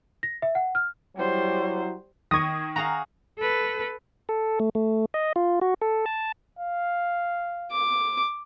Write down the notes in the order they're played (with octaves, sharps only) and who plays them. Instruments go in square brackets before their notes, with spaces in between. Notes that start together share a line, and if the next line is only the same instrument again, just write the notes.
[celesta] A#6
E5
F#5
F6
[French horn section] F#3 E4 [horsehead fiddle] G3 C5
[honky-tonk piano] D#3 [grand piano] C#6 A#6 [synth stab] D#6 G#6
[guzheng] F#4 G#4 F5 [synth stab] A#5
[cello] A4 B4
[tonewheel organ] A4
A3
A3
D#5
F4
F#4
A4
A5
[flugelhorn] F5
[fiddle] D6